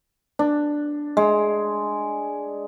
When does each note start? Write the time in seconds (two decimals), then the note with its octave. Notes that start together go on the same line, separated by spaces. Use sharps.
0.39 D4
1.17 G#3